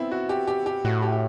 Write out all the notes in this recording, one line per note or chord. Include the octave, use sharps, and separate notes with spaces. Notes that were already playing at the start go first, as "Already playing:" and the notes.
Already playing: B3 C4 E4
F#4
G4
G4
G4
A2 F#4
G4
G4